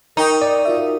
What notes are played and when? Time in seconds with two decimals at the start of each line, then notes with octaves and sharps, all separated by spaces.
0.17 D#4 A#4 G5 C#6 D#6
0.42 D5
0.65 F4 F#4 E5